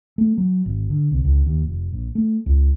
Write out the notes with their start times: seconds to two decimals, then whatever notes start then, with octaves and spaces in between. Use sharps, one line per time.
0.18 A3
0.38 F#3
0.66 G#1
0.90 D3
1.11 C2
1.25 C#2
1.46 D#2
1.65 F1
1.92 A#1
2.15 A3
2.46 C#2